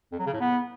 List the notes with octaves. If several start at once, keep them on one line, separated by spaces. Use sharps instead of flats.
F2
F#3
C#3
A2
B3